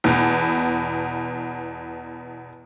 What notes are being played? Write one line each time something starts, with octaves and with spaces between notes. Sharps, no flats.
E2 B2